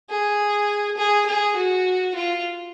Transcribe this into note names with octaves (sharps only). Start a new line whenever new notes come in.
G#4
G#4
G#4
F#4
F4